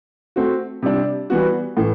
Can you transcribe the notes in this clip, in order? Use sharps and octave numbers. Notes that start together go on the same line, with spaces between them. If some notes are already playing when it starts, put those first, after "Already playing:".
A3 C4 F#4
C3 G3 D4
E3 G3 B3 F#4
A2 E3